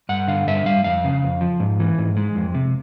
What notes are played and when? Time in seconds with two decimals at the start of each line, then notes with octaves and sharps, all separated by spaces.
0.09 G2 F#5
0.28 D3 F5
0.47 G2 E5
0.66 G3 F5
0.84 F2 F5
1.04 C#3
1.23 F2
1.41 F3
1.60 G#2
1.80 E3
1.98 G#2
2.17 G#3
2.35 F2
2.55 C3